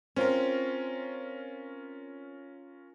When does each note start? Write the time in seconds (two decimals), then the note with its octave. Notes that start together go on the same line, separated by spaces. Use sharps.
0.16 C4 C#4 F4 A#4